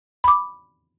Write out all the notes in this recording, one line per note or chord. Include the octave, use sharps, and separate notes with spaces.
B5 D6